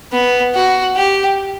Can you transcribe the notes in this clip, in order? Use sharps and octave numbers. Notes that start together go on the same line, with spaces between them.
B3
F#4
G4